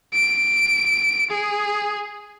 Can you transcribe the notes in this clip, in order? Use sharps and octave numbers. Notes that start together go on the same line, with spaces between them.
D7
G#4